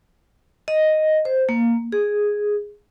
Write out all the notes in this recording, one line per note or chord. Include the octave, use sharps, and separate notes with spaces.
D#5
C5
A#3
G#4